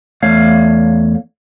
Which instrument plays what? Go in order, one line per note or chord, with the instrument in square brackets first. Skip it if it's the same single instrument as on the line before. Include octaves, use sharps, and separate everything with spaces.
[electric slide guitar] E2 A3 C#5 F5